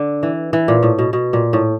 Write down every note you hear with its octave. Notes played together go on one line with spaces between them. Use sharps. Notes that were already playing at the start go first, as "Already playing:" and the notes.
Already playing: D3
E3
E3
A#2
A2
B2
B2
A#2
A2